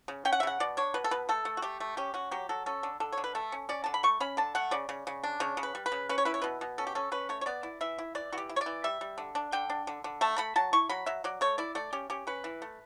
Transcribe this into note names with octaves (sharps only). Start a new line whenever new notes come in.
C#3
C#4 G5
F#5
E5
C#3 F#5
B2 D5
D4 C#5
B2 B4
A4
B2 B4
A3 A4
A3
F#4
A3 G4
A3
C#4 G4
C#4 F#4
F#3 G4
F#3 A4
C#4 A4
D3
D3 A4
D3 C#5
B4
A3 A4
C#4
C#4 D5
D3 A5
B5
A3 C#6
C#4 B5
D3 A5
A3 F#5
C#3 D5
C#3
C#3
D4
C#3 C#5
C#3
B4
G3
B4
C#3
C#4 B4
C#5
E4 B4
C#5
B2 B4
B2
C#4 A4
G4
C#4 A4
C#4 B4
A3 C#5
C#5
B3 D5
E4
E3 E5
E4
E3 D5
E3 F#4
G4
E4
C#5
D5
E3
G3 E5
G3
D3
D4
D3 G5
D4
D3
D3
A3 A5
A3 B5
F#3 A5
E4 C#6
F#3 B5
F#3 E5
F#3 D5
A3 C#5
E4 D5
A3 D5
C#4 G4
C#4 G4
C#4 B4
E3
A3